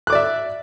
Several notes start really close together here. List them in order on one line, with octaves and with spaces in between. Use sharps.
F#6 D6 D5 E5